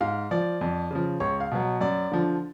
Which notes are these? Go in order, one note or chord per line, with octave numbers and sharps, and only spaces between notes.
G#2 F5
F3 D5
F2
C#3 F3
C#2 C#5
F5
B2 F#3
F#2 D5
D3 F3